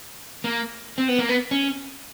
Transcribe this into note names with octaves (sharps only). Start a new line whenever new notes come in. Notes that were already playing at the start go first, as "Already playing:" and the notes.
A#3
C4
B3
A#3
B3
C#4